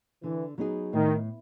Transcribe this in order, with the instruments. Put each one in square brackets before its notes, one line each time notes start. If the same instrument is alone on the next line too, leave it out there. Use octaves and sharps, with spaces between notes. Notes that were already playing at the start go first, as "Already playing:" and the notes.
[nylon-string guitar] D3 [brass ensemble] E3
[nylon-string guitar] F#3 B3 D#4 G#4
[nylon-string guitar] A2 [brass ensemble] D#3